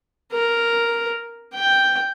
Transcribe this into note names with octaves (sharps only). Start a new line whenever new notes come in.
A#4
G5